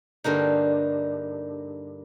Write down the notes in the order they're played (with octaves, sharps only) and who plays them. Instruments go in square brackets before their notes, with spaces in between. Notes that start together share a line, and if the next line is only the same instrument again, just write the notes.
[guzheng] G2 D3 A#3 D#4